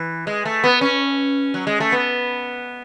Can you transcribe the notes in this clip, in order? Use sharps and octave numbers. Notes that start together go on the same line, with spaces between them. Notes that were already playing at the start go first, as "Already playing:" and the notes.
Already playing: E3
G#3
A3
B3
C#4
F#3
G#3
A3
B3